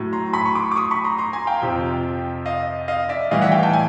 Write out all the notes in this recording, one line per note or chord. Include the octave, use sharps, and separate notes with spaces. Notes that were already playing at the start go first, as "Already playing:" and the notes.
Already playing: A2 F#3
A#5 C6
B5 C#6
C#6
C6 D6
D6
C#6 D#6
B5 C#6
A#5 C6
A#5 C6
G#5 A#5
F5 G5
F2 C3 F3
D#5 F5
D#5 F5
D5 E5
A2 E3 G3 D#5 F5
E5 F#5
F5 G5
G5 A5
G#5